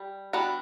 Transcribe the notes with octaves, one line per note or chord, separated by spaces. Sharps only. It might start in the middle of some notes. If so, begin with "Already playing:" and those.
Already playing: G3
G3 B3 D4 F#4